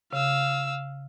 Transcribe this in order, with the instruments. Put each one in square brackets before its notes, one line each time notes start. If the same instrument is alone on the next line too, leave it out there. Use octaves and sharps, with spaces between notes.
[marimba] C#3 [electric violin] F5 E6